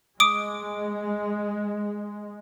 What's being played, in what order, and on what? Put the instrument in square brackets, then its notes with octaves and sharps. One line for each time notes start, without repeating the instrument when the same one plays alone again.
[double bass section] G#3 [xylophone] D6 D#6 D7